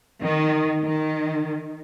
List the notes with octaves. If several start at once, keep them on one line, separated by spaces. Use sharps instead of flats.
D#3
D#3